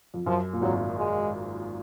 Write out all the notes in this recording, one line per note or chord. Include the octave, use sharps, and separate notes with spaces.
F2
F#2 F3
A#2
G#1 G#2 F#3
G#3